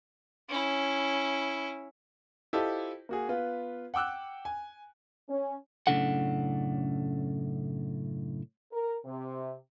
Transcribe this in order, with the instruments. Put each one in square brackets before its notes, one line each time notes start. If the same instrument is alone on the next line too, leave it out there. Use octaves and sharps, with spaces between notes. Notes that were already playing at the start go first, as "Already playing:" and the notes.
[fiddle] C#4 E4
[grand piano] E4 F4 G4 A4 C5 D#5
A#3 F#4 G#4
B3 F4 B4
F#5 G5 D6 E6 F#6
G#5
[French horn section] C#4
[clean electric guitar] F#2 A2 C#3 D4 A4 F#5
[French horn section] A#4
C3